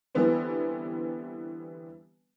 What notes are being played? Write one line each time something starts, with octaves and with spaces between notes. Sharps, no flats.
D3 E3 G3 B3 C4